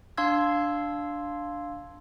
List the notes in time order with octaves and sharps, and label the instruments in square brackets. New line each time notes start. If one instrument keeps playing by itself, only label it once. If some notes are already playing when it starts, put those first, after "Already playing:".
[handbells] D4 F5 C6 E6 G#6